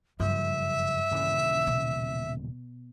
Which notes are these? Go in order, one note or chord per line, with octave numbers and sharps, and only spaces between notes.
F#1 C2 G2 F3 E5
D#1 C#3 E3
B2